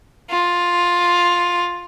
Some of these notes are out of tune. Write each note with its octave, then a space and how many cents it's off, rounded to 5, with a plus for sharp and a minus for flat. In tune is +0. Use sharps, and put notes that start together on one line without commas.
F4 +10